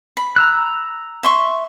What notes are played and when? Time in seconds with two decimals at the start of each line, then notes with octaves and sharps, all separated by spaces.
0.17 B5
0.36 A#5 E6 F#6
1.23 E5 C6 C#6